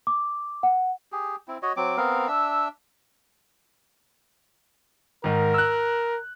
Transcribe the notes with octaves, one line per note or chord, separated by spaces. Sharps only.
D6
F#5
G4 G#4
C4 E4
F#4 C#5 D#5
F#3 C4 D6
B3 C4 A#4 F5
D4 E5 E6
G#2 D#3 A#4
E6 F#6